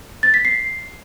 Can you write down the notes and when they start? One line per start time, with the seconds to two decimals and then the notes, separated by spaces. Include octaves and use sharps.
0.23 A6
0.34 B6
0.45 C7